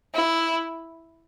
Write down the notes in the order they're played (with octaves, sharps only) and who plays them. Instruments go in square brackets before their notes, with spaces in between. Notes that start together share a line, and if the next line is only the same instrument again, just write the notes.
[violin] E4